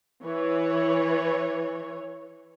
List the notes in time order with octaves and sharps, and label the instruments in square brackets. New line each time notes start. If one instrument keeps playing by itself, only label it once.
[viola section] E3 C#5